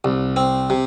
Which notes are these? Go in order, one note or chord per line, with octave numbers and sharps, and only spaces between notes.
C2
C4
C3